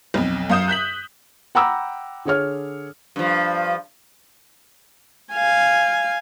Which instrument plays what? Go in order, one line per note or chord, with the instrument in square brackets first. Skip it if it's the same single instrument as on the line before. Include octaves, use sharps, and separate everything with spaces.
[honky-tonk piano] B1 F2
F#2 F5 D#6 G6 E7
F#6 G6 B6 F#7
[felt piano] F#5 G5 A#5 B5 D6 E6
D3 G#4 C#5 F6
[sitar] G2 F3
[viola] F5 G#5